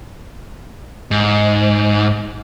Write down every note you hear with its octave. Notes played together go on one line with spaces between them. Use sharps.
G#2